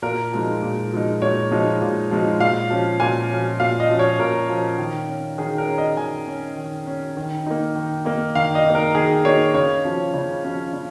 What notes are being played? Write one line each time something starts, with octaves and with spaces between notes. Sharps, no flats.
A#2 A#4
F3 G#3 D#4
A#2
F3 G#3 D#4
A#2 C#5
F3 G#3 D#4
A#2
F3 G#3 D#4
A#2 F5
F3 C#4
A#2 G#5
F3 C#4
A#2 F5
D#5
F3 C#4
C#5
A#2 A#4
F3 C#4
D#3
C#4
D#3 G#4
A#4
C#4
D#5
D#3 G#5
C#4
D#3
C#4
D#3
A#3 D#4
D#3
A#3 D#4
D#3 F5
D#5
A#3 D#4
A#4
D#3 G#4
A#3 D#4 C#5
C#3 C#5
F3 C#4
C#3
F3 C#4
C#3